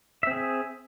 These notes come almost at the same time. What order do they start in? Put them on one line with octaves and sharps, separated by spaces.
E5 C4 G#4